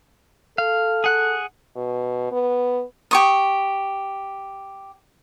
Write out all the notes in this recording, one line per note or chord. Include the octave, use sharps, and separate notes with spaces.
A4 F5
G#4 F#5 F#6
B2
B3
G4 C#6 D#6